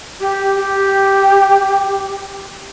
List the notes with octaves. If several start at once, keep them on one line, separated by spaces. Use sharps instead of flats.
G4
G4